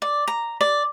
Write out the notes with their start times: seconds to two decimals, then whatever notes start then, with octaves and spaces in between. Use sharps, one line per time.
0.02 D5
0.28 A#5
0.61 D5